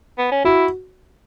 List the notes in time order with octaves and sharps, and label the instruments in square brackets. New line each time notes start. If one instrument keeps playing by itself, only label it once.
[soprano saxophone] B3
C#4
[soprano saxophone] E4 [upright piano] F#4